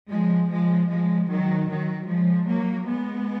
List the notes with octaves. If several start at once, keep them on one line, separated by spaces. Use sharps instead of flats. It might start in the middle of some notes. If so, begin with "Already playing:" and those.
F3 G#3
F3 G#3
F3 G#3
D#3 F#3
D#3 F#3
F3 G#3
F#3 A#3
G#3 B3